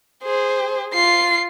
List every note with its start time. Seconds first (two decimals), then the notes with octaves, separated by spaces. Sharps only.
0.23 G#4 C5
0.94 F4 C7